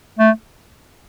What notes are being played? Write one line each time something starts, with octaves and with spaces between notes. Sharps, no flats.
A3